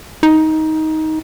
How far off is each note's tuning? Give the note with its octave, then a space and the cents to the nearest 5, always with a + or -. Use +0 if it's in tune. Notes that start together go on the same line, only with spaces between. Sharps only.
D#4 +15